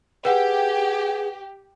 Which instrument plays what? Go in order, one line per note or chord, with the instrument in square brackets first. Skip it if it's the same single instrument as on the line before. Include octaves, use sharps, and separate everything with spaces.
[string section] G4 [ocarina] G#4 [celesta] B4 F#5 G5